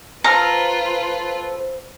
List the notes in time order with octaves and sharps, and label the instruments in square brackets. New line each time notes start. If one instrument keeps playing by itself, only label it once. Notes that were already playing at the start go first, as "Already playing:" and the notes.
[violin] F4 B4 [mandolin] A4 F6 [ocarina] C5 [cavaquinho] A#5